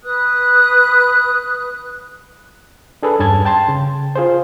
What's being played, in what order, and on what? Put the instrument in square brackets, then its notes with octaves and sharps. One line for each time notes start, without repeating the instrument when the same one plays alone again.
[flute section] B4 D#6 F#6
[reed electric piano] D4 G#4 A4 B4
E2 G2 C#4 A5 G#6
G5 A5 C6
C#3
F4 G#4 C5